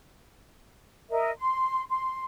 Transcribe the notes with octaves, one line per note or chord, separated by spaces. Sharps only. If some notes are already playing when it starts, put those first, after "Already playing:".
A#4 D#5 E5
C6
C6